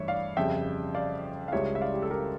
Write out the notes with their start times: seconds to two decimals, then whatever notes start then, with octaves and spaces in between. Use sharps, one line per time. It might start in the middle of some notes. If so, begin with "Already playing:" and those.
Already playing: G2 E3 A3 C#5 E5
0.08 D5 F5
0.37 F2 C#3 G3 E5 G5
0.95 D5 F5
1.48 F5
1.52 C#2 C#3 G3 C#5 E5
1.75 E5
1.81 D5 F5
1.94 G4
2.02 A4
2.10 G4 A#4